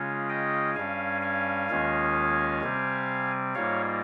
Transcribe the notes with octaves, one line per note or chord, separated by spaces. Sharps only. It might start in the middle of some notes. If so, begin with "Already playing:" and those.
Already playing: C#3 G#3 C#4 F4
D#5 G5
G2 G3 C#4 F5 G#5
F5 G#5
D#2 D#3 G#3 C#4 F4
C3 G3 C4
G#2 G3 A#3 F4 C#5 F5